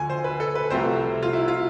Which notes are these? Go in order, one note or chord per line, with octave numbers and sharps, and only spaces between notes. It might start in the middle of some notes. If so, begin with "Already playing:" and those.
Already playing: D2 D3 F3 G#5
C5
B4
A4
B4
C2 C3 F3 A3 C4 C5
F4
E4
F4